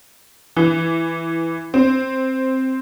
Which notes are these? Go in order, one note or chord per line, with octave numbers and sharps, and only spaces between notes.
E3
C4